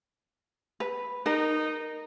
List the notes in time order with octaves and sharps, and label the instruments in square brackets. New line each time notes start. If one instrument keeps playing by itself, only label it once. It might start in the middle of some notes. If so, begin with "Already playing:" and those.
[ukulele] B4
[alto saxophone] D#4 [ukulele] A#4